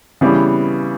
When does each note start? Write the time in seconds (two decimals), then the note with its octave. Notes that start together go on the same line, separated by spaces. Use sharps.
0.21 C#3 E3 G3 B3